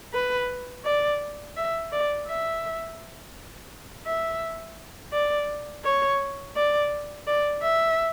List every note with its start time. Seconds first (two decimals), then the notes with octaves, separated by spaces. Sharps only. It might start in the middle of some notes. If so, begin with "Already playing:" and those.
0.14 B4
0.85 D5
1.56 E5
1.92 D5
2.27 E5
4.06 E5
5.13 D5
5.84 C#5
6.56 D5
7.27 D5
7.63 E5